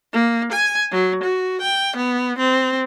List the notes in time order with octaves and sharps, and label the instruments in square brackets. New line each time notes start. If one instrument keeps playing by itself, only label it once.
[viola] A#3
G#5
F#3
F#4
G5
B3
C4